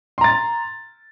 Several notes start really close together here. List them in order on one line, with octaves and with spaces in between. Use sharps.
C6 A#5 A6